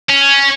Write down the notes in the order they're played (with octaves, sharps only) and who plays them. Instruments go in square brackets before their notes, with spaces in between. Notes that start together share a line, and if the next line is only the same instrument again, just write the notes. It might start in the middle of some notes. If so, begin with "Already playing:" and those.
[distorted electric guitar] C#4